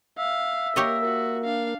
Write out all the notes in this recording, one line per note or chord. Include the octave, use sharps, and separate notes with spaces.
E5 F5
A#3 G4 A#4 C#5 D#5
F#4
D4 F5